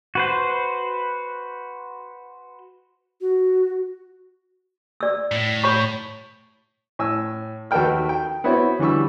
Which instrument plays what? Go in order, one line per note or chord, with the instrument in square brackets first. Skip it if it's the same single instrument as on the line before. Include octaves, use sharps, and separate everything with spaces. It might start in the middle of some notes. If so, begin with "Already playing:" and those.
[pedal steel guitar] F#4 B4 C5
[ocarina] F#4
[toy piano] D5 E6
[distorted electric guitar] A2
[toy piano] C#5 B5 C#6
[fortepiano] A2 G#5 E6
D#2 F#4 A4 B4 G5 F6
G5
B3 C4 E4 F#4 C#5
D3 E3 G3 C#6 E6